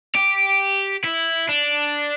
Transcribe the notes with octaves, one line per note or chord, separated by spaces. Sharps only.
G4
E4
D4